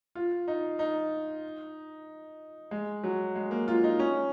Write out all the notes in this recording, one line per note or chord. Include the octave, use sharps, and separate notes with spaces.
F4
D#4
D#4
G#3
F#3
G#3
A#3
F4
D#4
C#4